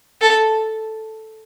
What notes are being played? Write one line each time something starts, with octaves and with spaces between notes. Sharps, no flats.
A4